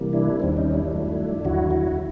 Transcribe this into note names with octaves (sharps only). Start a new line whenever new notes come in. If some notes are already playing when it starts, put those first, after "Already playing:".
Already playing: C3 E3 G3 A#3
D4 E4
D#2 D#3 G3 C4 D4
C#4 D#4
D4 E4
G2 D#3 F#3 A3
D#2 D3 F#3 E4 F#4
E4 F#4